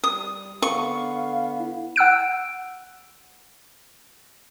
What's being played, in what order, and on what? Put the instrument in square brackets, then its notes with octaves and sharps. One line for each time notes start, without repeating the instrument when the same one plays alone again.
[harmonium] G3 [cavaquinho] D#6
[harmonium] D3 B3 [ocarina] F5 [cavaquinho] C#6
[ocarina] E4
[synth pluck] F#5 E6 F#6 D7